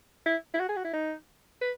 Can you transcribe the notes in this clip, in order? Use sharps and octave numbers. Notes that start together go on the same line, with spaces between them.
E4
E4
F#4
G#4
F#4
E4
D#4
B4